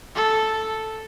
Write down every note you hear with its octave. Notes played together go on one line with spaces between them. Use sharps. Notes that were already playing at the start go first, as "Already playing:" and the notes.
A4